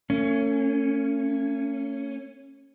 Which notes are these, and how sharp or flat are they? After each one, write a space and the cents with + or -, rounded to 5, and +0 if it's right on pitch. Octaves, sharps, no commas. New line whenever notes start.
A3 +45 C#4 +0